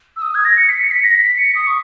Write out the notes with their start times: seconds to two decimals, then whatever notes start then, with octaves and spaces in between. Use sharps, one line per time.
0.16 E6
0.22 D#6
0.35 G#6
0.45 A#6
0.57 C#7
0.69 B6
0.81 C#7
0.91 B6
1.03 A#6
1.15 B6
1.38 C#7
1.55 D#6
1.67 C#6